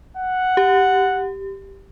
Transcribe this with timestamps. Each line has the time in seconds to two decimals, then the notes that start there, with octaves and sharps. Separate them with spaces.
0.17 F#5
0.57 G4